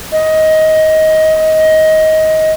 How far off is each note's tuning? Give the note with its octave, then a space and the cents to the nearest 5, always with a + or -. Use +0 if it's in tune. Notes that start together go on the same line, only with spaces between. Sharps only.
D#5 +15